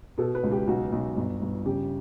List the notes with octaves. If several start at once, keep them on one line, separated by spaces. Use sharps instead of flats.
B2 A4
B4
C#2
G4
B1 F#4
B1
G1
G1
C#3 G4